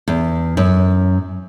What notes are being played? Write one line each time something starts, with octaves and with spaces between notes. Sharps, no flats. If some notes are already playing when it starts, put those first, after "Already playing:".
E2
F#2